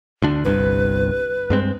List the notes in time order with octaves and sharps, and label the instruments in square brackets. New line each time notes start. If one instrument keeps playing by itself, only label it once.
[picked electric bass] D2 D3 D4
[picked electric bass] G1 C2 G2 [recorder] B4
[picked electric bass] G2 G#3 C4